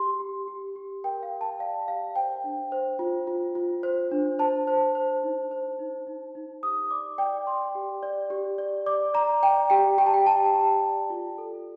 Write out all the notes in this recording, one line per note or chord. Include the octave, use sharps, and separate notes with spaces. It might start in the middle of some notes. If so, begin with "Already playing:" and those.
Already playing: G4 C6
G4
G4
G4
A#4 G5
F5
A#4
A5
D5 F5
G4 F5
C5 G5
D4
C5
F4
F4
F4
C5
D4
C5 A5
C5
C5
D#4
C5
D#4
D#4
D#4
G4 D#6
D5 D6
D5 G5
D5 C6
G4
D5
G4
D5
D5 D6
D5 A#5
D5 G5
G4 G5
G4 G5
A5
G5
G4 A5
G4
D5
F4
A4